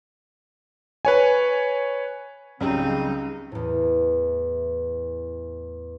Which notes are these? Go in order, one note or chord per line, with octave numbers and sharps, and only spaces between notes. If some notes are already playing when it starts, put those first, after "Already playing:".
B4 C#5 G#5
C#2 C#3 F#3 G3 C4 C#4 D#4
E2 A2